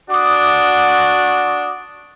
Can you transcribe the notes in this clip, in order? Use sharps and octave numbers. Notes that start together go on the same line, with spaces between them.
D4 F#4 D6 D#6